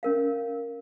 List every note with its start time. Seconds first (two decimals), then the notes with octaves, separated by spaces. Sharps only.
0.03 C#4 A#4 F5